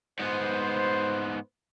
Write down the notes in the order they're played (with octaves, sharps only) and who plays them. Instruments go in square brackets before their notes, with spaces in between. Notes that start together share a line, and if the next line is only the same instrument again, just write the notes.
[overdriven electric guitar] G#2 B3 [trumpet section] B4 C5